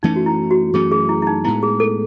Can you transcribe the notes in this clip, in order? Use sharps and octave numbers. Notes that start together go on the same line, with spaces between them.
F#2 E3 A3 C#4 D#4
F#4
E4
F#4
F#2 E3 A3 C#4 G#4
G#4
E4
E4
D#4
A2 G#3 B3 E4
G#4
A4